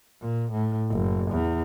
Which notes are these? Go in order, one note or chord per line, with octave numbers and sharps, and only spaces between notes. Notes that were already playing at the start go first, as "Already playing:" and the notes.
A#2
A2
F#1
E2